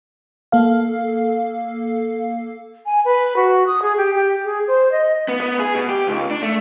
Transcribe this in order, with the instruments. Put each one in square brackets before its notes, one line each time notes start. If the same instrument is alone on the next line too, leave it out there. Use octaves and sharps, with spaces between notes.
[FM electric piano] A#3 A4 F5
[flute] G#5
B4
F#4
D#6
G#4
G4
G4
G#4
C5
D#5
[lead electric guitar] B3
B3
G#4
B2
G4
C#2
D4
A3